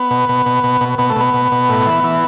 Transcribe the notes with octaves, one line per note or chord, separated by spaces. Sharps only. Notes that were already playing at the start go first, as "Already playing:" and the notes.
Already playing: B3
B2
B2
B2
B2
B2
B2 B3
A3
B2 B3
B2
B2
A2
E3
E3